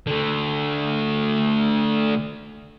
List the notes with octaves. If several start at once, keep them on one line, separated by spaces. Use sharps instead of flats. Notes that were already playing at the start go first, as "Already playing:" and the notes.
D3 A3